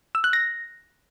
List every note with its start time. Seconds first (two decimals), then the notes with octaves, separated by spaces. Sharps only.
0.15 E6
0.24 F#6
0.33 A#6